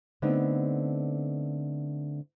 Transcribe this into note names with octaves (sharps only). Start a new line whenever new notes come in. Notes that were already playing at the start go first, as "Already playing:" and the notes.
D3 A3 B3 C4 D#4